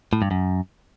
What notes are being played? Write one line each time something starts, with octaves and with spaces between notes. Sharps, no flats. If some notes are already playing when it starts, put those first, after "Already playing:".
A2
G2
F#2